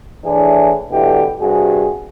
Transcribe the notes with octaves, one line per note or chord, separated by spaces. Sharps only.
A2 E3 D4 E4 G#4
B2 D3 E3 A3 G4
G2 C3 F#4 G#4